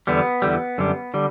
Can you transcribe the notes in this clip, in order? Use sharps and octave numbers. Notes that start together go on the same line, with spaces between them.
E2 D3 G3 B3
E2 D3 G3
F#2 D3 G3
D3 G3